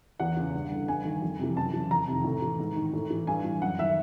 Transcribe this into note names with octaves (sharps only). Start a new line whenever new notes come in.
E2 F#5
C#3 E3
G2
D3
G2 G#5
D#3
F2
C3 E3
F#2 A5
C#3 E3
F2 A#5
C3 D#3
A2
E3
G#2
D#3
A2
E3
G2 G#5
E3
F#2 F#5
D#3 E5